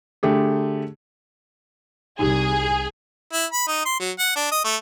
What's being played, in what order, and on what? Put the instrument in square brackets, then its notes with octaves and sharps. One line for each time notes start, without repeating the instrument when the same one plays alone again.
[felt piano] D3 A3 G4 G#4
[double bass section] C2 [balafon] D#4 G4 [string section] G#4
[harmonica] E4
B5
D#4
C6
F#3
F#5
D4
D#5
A3